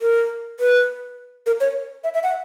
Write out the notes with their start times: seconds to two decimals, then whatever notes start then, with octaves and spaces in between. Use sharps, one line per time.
0.01 A#4
0.60 B4
1.46 A#4
1.60 C#5
2.04 E5
2.14 E5
2.23 F#5